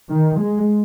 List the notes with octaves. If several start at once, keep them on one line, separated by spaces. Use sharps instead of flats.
D#3
G#3